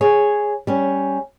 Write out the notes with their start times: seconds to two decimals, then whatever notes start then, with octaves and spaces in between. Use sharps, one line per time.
0.01 G#4 C#5
0.67 G3 C#4